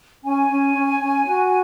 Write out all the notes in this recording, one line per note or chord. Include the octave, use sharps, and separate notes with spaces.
C#4 G#5
C#4
C#4
C#4
F#4